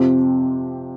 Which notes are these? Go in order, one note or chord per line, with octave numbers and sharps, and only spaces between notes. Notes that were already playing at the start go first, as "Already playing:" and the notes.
Already playing: F2 C3 F3 C4 G4